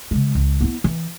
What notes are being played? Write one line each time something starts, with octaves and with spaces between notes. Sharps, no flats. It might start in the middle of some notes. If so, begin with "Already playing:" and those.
C#3 G#3
C#2
B3 E4
E3